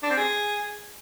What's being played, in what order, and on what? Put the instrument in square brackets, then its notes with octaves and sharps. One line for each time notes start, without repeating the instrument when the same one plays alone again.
[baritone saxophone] D4
C4
G#4